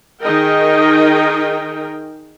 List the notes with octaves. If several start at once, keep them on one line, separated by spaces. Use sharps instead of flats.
D#3 D#4 G#4 A#4 D#5 G5